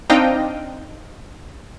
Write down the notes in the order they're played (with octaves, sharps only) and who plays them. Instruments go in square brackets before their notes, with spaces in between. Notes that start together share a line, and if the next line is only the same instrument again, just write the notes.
[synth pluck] C4 D4 D#4 D#5 F5 G5